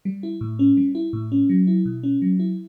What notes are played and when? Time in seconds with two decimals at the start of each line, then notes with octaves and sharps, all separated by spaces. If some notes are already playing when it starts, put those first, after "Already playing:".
0.05 G3
0.23 E4
0.41 A2
0.59 C#4
0.77 G3
0.95 E4
1.13 A2
1.32 C#4
1.49 F#3
1.67 E4
1.86 B2
2.03 C#4
2.22 F#3
2.40 E4